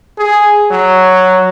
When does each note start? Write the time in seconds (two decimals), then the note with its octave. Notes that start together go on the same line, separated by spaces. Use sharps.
0.19 G#4
0.71 F#3